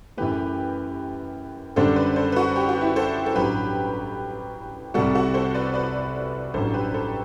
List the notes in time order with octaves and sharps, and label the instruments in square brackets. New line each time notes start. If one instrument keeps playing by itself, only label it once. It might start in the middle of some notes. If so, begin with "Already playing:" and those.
[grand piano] F#2 E3 A3 [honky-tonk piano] G4 B4
[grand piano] F#2 D3 G3 D4 [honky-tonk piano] A4 C5
[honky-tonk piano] B4 D5
A4 C5
B4
F#4 A4
G4
F#4
E4 G4
A4 C5
A4
[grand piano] A1 G2 F#3 [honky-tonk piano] G4 B4
[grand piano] C2 C3 G3 [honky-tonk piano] F#4 A4
[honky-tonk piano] F#4 A4
A4 C5
B4 D5
B4 D5
[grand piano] A1 G2 F#3 [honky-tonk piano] A4 C5
[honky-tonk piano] G4 B4
A4 C5